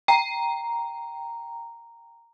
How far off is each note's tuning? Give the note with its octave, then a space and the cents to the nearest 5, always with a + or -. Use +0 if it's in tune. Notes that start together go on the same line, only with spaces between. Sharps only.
G5 +0 A#5 +0